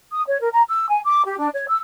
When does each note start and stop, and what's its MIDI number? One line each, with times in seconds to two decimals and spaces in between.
0.11 0.23 87
0.27 0.40 73
0.40 0.49 70
0.53 0.62 82
0.68 0.86 88
0.89 1.00 80
1.05 1.22 86
1.25 1.39 67
1.39 1.49 62
1.53 1.65 73
1.69 1.79 88